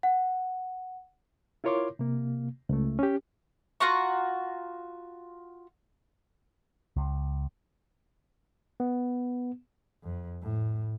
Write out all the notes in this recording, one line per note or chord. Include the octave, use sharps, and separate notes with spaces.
F#5
E4 F4 A#4 C#5 C6 D6
C3 A#3
C#2 A3
C#4 G4
F4 F#4 A#5 C#6
C#2
B3
F2
A2